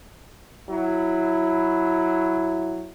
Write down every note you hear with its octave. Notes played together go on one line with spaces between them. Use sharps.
F#3 E4